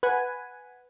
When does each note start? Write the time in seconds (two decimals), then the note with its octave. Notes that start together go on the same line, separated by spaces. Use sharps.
0.03 B4 F#5 G#5